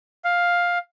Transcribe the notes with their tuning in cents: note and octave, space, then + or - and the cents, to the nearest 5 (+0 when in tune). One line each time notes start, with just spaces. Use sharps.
F5 +10